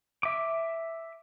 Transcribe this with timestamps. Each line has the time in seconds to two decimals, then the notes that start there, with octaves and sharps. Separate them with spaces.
0.23 E5 D6